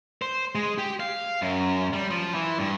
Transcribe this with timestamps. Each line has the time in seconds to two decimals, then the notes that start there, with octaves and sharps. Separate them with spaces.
0.22 C5
0.55 G#3
0.78 G4
1.00 F5
1.42 F#2
1.93 G3
2.11 F3
2.35 E3
2.59 G2